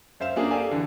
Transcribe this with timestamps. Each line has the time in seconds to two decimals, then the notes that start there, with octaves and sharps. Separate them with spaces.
0.20 F#2 C5 E5 F5 E7
0.36 A#3 C#4 D4 G#4
0.51 G4 A4 D5 F5 G#5
0.71 D3 E3